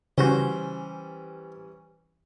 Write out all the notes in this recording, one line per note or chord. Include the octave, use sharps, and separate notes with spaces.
C#3 E3 G3 C#4 F#4 C5